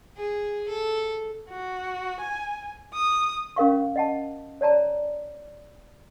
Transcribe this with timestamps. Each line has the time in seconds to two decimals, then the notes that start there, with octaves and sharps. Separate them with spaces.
0.17 G#4
0.68 A4
1.49 F#4
2.20 G#5
2.94 D#6
3.56 C#4 A#4 F5 C#6
3.96 D#5 F#5 A5
4.61 C#5 D5 A5 A#5